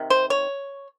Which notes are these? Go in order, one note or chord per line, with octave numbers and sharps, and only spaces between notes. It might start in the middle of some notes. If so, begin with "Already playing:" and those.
Already playing: C3 D#3
C5
C#5